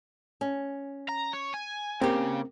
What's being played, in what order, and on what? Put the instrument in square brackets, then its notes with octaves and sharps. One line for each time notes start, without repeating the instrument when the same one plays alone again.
[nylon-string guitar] C#4
[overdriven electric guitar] A#5
C#5
G#5
[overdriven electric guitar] C#3 [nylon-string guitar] A#3 G4 [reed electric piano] C4